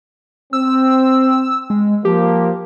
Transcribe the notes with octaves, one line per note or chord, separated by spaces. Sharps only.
C4 E6
G#3
F3 A#3 G4